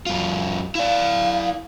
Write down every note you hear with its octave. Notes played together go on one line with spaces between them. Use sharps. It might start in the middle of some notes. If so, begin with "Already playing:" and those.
F#2 F4
E4 D5 F5